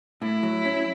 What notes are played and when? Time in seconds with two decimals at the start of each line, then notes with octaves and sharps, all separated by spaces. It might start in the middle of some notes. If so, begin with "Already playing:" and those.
0.22 A2 E4
0.43 F#3
0.65 C#4